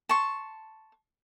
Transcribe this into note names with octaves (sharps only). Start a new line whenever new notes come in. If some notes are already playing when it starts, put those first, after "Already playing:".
A5 C6 C#6